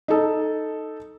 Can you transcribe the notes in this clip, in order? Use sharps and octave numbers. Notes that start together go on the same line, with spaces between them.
D#4 A4